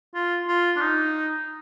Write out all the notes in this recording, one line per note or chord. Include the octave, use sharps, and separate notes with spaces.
F4
F4
D4
D#4